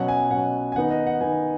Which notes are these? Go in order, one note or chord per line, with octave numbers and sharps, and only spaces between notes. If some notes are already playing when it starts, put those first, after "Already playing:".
Already playing: B2 F#3 C#4 F#5
G#5
B2 F#3 C#4 F#5
G#5
D#3 B3 D#4 F#5
D#5
F#5
D#3 B3 D#4 G#5